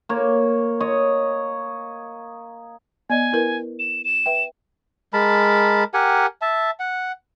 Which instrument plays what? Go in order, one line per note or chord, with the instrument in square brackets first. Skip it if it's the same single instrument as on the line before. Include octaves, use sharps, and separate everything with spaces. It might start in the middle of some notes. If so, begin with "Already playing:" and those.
[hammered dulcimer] A#3 C#5
C#5 D#5
[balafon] B3 D5 D#5 [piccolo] G#5
[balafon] E4 A#4 B4
[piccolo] E7
E7
[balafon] B4 E5 G5
[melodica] G#3 A#4 A5 B5
G4 A#4 F#5 G#5
E5 A5
F#5